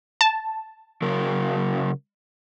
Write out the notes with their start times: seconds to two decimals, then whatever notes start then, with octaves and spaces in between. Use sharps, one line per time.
0.21 A5
1.02 C#3 F#3 A#4